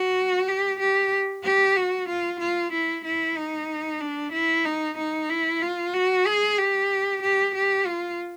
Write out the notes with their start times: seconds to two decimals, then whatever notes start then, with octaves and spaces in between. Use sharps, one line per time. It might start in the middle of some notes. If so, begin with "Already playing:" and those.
Already playing: F#4
0.48 G4
0.79 G4
1.44 G4
1.76 F#4
2.08 F4
2.39 F4
2.72 E4
3.04 E4
3.37 D#4
4.00 D4
4.32 E4
4.64 D#4
4.97 D#4
5.29 E4
5.61 F4
5.93 F#4
6.26 G#4
6.57 G4
7.21 G4
7.54 G4
7.86 F4